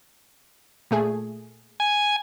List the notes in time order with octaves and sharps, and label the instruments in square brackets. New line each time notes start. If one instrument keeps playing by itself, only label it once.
[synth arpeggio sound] A#2 A3 G#4
[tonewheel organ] G#5